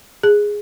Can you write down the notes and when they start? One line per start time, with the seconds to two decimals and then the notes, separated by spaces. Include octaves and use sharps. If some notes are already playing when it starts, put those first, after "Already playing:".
0.23 G#4